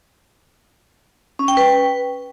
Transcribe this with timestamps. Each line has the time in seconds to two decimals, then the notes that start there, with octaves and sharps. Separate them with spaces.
1.39 C#4
1.48 G5
1.57 B4